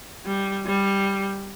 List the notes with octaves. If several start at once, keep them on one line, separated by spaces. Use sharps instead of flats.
G3
G3